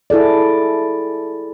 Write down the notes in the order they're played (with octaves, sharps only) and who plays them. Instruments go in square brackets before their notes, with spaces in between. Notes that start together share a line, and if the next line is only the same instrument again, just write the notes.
[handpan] E4 G#4 A4 D5